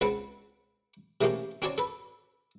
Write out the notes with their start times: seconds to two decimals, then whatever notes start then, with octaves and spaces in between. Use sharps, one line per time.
0.01 C#2 C4 B4 F#5 A5
1.21 C3 E3 A3 A#3 C#4 G4
1.62 C4 C#4 F#4 C#5 D5 A5
1.78 A4 B4